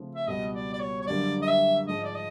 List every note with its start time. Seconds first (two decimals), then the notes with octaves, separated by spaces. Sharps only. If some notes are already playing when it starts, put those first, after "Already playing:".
Already playing: C#3 F3 A3 C4
0.15 E5
0.27 C#2 B2 G3 B3 D#5
0.54 D5
0.73 D5
0.80 C#5
1.01 C#5
1.07 F#2 D3 G3 A#3 D5
1.42 D#5
1.48 E5
1.87 G#2 F3 G#3 D#5
2.04 D5
2.15 D#5